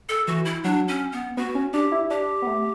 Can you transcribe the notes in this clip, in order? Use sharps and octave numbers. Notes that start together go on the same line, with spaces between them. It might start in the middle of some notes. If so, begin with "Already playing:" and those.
A4
E3 F#4
E4
F#3 D4
C#4
B3
B3 F#4
C#4
D4 G4
E4
D4 G4
B3
A3